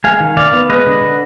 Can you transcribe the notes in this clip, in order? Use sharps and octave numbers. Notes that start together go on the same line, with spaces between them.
G#3 F5 G#5
D#3
D#3 D5 F5
B3
G#3 B4 D#5
D3
D3